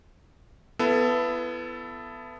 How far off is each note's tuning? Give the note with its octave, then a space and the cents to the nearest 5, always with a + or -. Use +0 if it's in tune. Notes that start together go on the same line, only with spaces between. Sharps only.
B3 +10 E4 +35 A4 +0